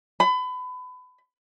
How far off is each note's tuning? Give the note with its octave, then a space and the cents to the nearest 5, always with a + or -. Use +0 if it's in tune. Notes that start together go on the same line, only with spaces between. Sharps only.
B5 +30